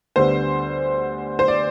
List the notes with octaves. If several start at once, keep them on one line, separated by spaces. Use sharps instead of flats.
D2 D3 G3 B3 C5
C5
D5